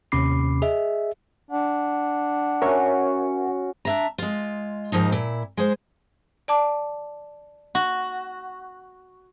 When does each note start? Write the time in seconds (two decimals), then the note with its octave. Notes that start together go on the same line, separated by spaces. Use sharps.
0.12 D#2 C3 C#4 B5 D6 C7
0.62 G#4 D#5 E5
1.51 D4 F#5
2.62 C#4 F#4 A#4 C#5 E5
3.85 D4 E5 A#5
4.18 G#3 F4
4.92 D#2 G#2 F3 D#4
5.12 A#2 E4
5.57 G#3 G#4 C5
6.48 D5 A5 D6
7.75 F#4